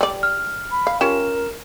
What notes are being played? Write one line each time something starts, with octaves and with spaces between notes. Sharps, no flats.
G3 D5
F6
B5
F5
C#4 F4 G4 A#4 E7